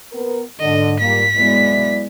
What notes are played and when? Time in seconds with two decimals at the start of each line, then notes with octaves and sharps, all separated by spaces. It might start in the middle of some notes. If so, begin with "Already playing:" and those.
0.12 B3 A#4
0.60 G#2 D3 D#5
1.00 A#2 G3 A#3 B6
1.37 F#3 G#3 B3 E4 D5